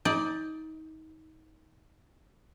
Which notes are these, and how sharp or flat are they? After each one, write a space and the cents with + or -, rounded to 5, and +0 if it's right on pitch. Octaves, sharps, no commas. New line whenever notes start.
D#4 +25 D5 +0